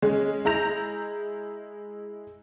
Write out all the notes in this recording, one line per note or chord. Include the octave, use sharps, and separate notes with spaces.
G#3 C#4
G#3 E4 A#5 G6 A#6 F7